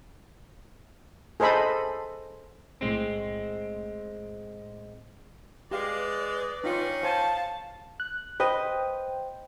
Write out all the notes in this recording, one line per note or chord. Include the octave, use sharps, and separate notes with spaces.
G#4 A4 C5 D#5 B5
B1 A2 G#3 C4
G#3 G4 B4 D5 F5
D#3 C#4 D#4 F4
C5 F5 G#5 A5 C6
F#6
B4 C5 D#5 G5